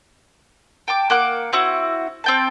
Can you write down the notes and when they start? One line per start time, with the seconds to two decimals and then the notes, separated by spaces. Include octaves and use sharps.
0.88 G5 A5 D6
1.10 A#3 F#5 D6
1.53 C4 E4 F#4
2.24 C4 G5 A5